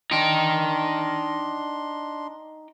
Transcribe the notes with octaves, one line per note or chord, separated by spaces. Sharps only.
D4 D#4 G5 C6